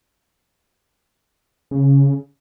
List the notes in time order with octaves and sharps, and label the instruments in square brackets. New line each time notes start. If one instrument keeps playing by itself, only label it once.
[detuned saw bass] C#3